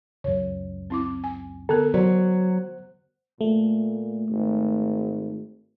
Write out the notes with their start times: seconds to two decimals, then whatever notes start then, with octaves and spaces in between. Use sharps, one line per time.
0.24 C#2 F#2 C#5
0.90 C4 E4 D6
1.24 G#5
1.69 D3 B3 A4 A#4
1.94 F#3 C5 D5
3.41 A#2 A3
4.29 G#1